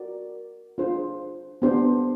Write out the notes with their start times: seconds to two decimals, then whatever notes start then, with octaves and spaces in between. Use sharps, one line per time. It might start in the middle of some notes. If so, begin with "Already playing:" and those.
Already playing: F#4 A#4 D5
0.78 D4 F4 G#4 C5
1.62 B3 D4 G4 C5